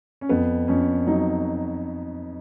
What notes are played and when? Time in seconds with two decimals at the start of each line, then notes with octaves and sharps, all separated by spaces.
0.21 C#4
0.29 F2 B3
0.68 F2 C#4
1.07 F#3 D#4